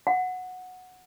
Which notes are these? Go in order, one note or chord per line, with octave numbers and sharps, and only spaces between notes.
F#5